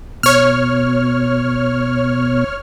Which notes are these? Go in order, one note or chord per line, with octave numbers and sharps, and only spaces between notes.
B2 C#5 F6